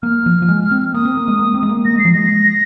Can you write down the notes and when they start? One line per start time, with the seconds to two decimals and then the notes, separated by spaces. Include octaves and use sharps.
0.02 A#3 F6
0.26 F3
0.42 F3
0.48 G#3
0.71 C4
0.94 A#3 D#6
1.05 C4
1.17 A#3
1.28 G#3
1.39 A#3
1.54 C4
1.63 G#3
1.69 A#3
1.85 A#3 A#6
1.96 G#3 C7
2.05 F3
2.13 G#3 A#6